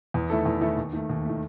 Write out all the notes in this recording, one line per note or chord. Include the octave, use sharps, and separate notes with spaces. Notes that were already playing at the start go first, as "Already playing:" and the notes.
E2
D#3 A3 E4 A4
E2
D#3 A3 E4 A4
D#2
D#3 A3
D#2
D#3 A3